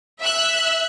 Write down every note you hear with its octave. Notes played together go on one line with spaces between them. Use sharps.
E5 E6 F#6